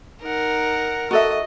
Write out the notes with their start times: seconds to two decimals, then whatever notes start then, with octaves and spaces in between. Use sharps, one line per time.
0.22 D#4 A#4 F#5
1.11 F#4 A4 D#5 E5